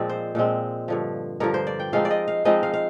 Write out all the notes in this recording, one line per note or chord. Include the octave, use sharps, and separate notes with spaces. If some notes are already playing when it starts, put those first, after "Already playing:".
Already playing: A#2 F3 G#3 C4 D5
C5
A#2 F3 G#3 C4
G2 D3 F3
G2 D3 F3 A#4
C5
D5
G5
F3 G#3 C4 D#4 F5
D5
D#5
F5
F3 G#3 C4 D#4 D#5
F5
F5